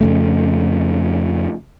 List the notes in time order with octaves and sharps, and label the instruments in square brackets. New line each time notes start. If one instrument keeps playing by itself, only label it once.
[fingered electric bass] F2 C#3 A3